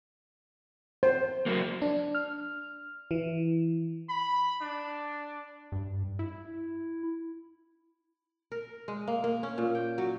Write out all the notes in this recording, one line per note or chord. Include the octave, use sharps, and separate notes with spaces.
C5
F#3 A#3
D4
F6
E3
B5
D4
G2
E4
A#4
G#3
A#3
A#3
C#4
A#2
G5
F#3